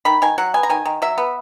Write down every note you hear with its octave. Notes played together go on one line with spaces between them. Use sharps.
D#3 B5
D#3 G#5
F#3 F#5
B3 G#5
A#5
D#3 G#5
D#3
F#3 E5
B3